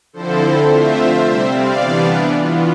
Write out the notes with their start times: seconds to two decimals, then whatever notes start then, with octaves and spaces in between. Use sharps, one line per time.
0.13 D3 F3 C4 E4 A4 C5
0.69 D3 A3 C4 F4 C5 E5
1.25 C3 G3 C4
1.53 D5 F5
1.81 E3 G3 B3 D4
2.38 E3 B3 F4